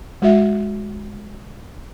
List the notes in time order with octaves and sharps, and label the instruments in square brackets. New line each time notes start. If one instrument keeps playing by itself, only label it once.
[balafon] G#3 F#4 E5